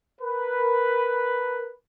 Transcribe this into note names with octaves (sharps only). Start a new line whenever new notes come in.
A#4 B4